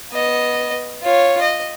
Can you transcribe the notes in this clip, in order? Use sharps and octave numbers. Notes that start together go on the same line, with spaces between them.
B3 D#5
F4 C#5
D#5